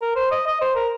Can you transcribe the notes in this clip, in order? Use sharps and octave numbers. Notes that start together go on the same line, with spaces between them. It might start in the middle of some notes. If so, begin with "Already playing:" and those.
A#4
C5
D#5
D#5
C5
A#4